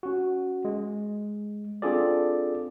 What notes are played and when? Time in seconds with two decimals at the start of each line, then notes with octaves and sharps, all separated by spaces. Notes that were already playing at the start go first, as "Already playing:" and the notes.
0.03 C#4 F#4
0.65 G#3
1.82 C4 D4 F4 G#4 A4 D5